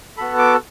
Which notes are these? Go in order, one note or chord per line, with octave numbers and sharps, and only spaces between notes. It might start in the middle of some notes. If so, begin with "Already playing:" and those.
B3 F#4 A4 B5
D6